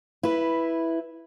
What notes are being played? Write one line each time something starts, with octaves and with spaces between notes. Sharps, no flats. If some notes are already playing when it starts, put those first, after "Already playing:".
E4 B4